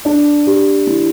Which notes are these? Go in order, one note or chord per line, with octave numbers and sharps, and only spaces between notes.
D4
G4
E3